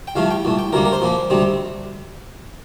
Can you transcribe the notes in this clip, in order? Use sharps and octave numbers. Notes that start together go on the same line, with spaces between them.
G5
C2 C3 F3 A3 F5
G5
C2 A#2 A3
G5
D2 C3 G3 A#3 A#4
A#4
C5
A#2 F3 A#3
D2 C3 G3 C4